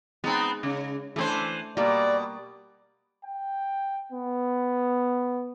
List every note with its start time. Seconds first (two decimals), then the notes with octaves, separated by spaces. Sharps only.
0.24 G#3 B3 C4 D#4
0.63 C#3
1.16 E3 A3 D4 G#4 C5
1.77 B2 G3 A#3 D5
3.25 G5
4.12 B3